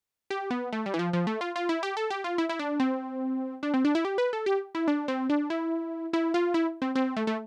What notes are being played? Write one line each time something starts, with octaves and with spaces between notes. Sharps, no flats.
G4
B3
A3
G3
E3
F3
F3
A3
F4
F4
E4
G4
A4
G4
F4
E4
E4
D4
C4
D4
C4
D4
E4
G4
B4
A4
G4
E4
D4
C4
D4
E4
E4
F4
E4
C4
C4
A3
A3